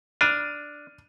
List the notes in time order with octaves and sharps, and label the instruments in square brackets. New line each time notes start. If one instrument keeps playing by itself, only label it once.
[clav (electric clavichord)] D4 [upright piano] F6 D#7 F7